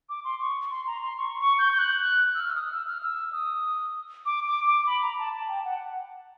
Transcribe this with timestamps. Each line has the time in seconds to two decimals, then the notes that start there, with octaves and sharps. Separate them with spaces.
0.09 D6
0.25 C6
0.41 C#6
0.71 C6
0.87 A#5
1.03 C6
1.18 C#6
1.39 C#6
1.59 G6
1.73 G6
1.79 F#6
2.35 E6
2.40 F6
2.51 E6
2.56 D#6
2.72 E6
2.87 F6
3.03 E6
3.33 D#6
4.26 D6
4.46 D6
4.67 D6
4.87 B5
5.02 A#5
5.19 A5
5.33 A5
5.49 G5
5.65 F#5